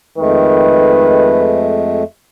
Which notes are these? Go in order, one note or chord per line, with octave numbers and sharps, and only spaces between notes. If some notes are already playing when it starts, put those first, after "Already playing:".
F2 D#3 G#3 A3 B4